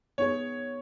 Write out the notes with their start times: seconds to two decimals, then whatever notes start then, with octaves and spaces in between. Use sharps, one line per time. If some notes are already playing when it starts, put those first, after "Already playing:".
0.18 B3 D#4 G#4 C#5